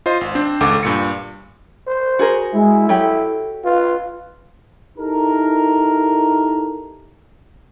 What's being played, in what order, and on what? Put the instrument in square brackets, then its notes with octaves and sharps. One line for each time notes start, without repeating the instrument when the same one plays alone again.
[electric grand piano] F4 C5 D#5 C6
G#1
C4 D4 C5
G#1 C#2 A4 F#5 D6
G2 A#2 C#7
[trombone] C5
[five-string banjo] F#4 G#4 A#4
[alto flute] G#3 [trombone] E4
[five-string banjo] F#3 G4 [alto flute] A4
[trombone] F4 [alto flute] B4
[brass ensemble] D#4 E4 G4 A4 A#4